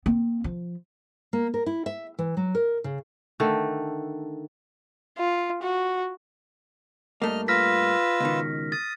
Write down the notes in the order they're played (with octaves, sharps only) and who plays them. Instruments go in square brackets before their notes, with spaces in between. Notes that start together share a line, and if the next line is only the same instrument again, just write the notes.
[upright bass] A#3 C4
F3
[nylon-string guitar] A#3
A#4
E4
E5
E3
F#3
A#4
C#3
[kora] D3 D#3 A3
[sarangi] F4
F#4
[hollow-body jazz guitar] G2 A3 A#3 [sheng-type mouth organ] D#5 F6
[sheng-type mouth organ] F4 B4 E6 [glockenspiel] F6 A#6 B6
[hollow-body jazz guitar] C#2 B2 D#3
[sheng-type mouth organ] D#6 [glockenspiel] A6